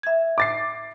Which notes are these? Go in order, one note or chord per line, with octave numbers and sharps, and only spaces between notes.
E5 G#6
D6 A6 C7